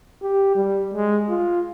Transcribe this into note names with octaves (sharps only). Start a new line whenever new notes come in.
G4
G3
G#3
F4